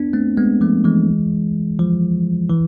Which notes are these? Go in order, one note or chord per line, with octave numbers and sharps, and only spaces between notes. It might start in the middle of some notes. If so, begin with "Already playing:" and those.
Already playing: B3 D4
A3 C4
G#3 B3
F3 A3
E3 G#3
F3
E3